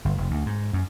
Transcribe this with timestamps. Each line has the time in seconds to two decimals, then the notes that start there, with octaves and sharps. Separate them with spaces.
0.05 G1
0.18 F1
0.31 D2
0.46 G#2
0.73 F#2